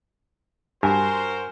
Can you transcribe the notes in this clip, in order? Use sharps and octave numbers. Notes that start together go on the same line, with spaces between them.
G2 F#4 A#4 C5 G#5